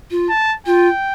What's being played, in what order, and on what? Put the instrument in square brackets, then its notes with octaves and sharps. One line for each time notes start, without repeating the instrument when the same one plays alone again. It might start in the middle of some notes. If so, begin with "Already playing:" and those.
[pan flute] F4
[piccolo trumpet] A5
[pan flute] F4 [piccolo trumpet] G5